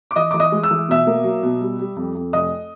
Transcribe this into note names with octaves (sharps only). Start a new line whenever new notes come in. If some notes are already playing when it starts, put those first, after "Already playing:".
D6
E3 D#5 D#6
E3 D6
D#5 D#6
G#3
E6
E3
B2 E5 E6
A#3
F#3
B2
G3
G3
F2
F2
F1 D#5 D#6